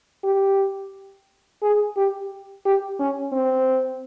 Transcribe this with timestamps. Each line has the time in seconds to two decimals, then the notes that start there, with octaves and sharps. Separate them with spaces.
0.24 G4
1.62 G#4
1.96 G4
2.65 G4
3.00 C#4
3.33 C4